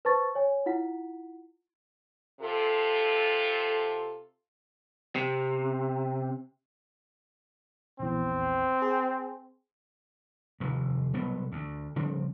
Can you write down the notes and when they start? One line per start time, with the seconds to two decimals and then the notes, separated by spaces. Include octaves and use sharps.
0.05 B4 C5 A5 C#6 A6
0.35 C#5 G#5
0.66 E4 F4 F#5 B6
2.41 C3 F4 A4
5.16 C3
7.99 A#1 E2 C4
8.82 G#4
10.60 F1 D#2
11.14 C2 B2 F#3 B3
11.52 D2
11.96 C#3 F3 G3 C4